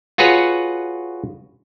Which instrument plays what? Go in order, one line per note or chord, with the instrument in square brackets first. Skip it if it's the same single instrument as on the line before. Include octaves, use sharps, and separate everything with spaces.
[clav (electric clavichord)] F4 F#4 G#4 B4 C#5